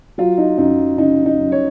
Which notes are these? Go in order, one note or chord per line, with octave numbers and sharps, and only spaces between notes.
F#3 F4
D#4
F#2 D#4
C#3 D#4
D#4
F#2
C#5